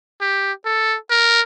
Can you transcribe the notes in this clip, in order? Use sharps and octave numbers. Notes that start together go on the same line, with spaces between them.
G4
A4
A#4